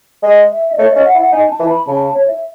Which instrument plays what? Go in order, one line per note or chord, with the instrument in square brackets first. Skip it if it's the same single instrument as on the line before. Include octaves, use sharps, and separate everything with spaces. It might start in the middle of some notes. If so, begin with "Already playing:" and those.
[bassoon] G#3
[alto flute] E5
D#5
[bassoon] A3 [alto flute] C#5
[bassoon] C#4 [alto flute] D#5
[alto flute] F#5
[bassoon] E4
[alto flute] F#5
[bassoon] D#4 [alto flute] G#5
[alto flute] A5
[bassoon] E3
[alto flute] B5
[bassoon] C#3 [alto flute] A5
[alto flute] A5
C#5
E5